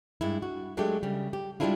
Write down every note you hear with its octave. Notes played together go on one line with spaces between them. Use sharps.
G2 G#3 E4
F#4
F#3 G#3 A3 D4 G4
C#3 G3
G4
G3 G#3 A#3 D4 E4 F4